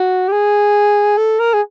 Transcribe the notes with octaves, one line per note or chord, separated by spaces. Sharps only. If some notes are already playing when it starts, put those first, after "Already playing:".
Already playing: F#4
G4
G#4
A4
A#4
G#4